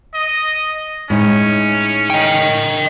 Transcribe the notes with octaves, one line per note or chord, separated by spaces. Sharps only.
D#5
A2 G#3 C#4 D#4
D#5 G5